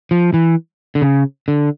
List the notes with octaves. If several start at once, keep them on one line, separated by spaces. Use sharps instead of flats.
F3
E3
D3
C#3
D3